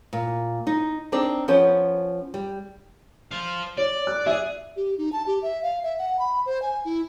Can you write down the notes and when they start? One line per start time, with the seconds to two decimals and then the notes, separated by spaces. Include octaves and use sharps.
0.13 A#2
0.67 D#4
1.12 C4 D4 D#4 D5
1.48 F3 B3 C#4 C5
2.34 G3
3.31 C5 F5
3.77 C#5 D5
4.07 F#6
4.26 G#4 D5 E5
4.76 G4
4.98 D#4
5.13 A5
5.27 G4
5.42 E5
5.63 F5
5.83 E5
5.99 F#5
6.19 B5
6.46 C5
6.62 G#5
6.85 E4